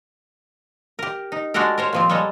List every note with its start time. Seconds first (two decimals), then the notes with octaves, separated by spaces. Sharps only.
0.99 G4 A#4
1.32 D#4
1.54 G#3 D4 F#4 G4 A4 A#4
1.78 A#4 C5 C#5
1.93 A#2 F3 C4
2.09 G3 G#3 A4 C#5 D#5